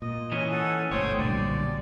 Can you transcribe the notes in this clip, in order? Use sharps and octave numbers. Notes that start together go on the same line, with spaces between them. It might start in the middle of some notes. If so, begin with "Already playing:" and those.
A#2 D#5
E3 C#4
A4 F#5
G1 B2 A3 C5 C#5 G5 D#6
B1 G2 A#2 D3 G3 D5